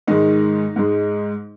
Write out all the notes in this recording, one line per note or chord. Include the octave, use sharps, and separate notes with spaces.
G#2 D#3 G#3 D#4
G#2 G#3